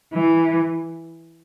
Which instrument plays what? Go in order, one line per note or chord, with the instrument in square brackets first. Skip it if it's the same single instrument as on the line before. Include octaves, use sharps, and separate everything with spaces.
[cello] E3